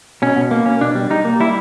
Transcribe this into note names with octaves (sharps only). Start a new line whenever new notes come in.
B2 C#4
B2
A#3
C#4
B2 D4
G3
G3 D#4
A#3
G3 E4